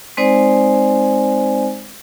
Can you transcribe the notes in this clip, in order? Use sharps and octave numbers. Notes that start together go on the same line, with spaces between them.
G#3 C4 D#4 C5 D5 G#5